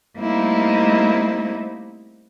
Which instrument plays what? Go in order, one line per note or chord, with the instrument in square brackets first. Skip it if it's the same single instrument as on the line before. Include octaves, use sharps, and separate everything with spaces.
[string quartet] G3 A3 A#3 C4 D#4 E4